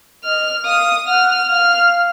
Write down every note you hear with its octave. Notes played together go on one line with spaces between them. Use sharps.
D#5 F6
F5 D#6
F#5 F6
F5 F6